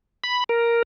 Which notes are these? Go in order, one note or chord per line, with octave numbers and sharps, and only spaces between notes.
B5
A#4